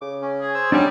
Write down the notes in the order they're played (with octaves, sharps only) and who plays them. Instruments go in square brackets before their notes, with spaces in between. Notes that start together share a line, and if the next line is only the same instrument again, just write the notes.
[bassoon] C#3 [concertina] D6
[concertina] C#4
[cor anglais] G#4
[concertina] C5 E6
[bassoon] F#3 [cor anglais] G3 [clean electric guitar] D4 D#4 G#4